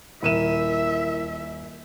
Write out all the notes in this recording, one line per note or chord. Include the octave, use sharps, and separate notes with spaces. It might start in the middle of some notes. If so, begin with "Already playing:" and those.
D#1 E4 A#4 E5 D#7 E7